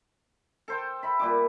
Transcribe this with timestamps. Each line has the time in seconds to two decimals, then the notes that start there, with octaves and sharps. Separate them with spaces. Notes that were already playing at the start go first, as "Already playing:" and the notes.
0.68 A4 C5 G5
1.03 E5 B5
1.19 A#2 G3 D6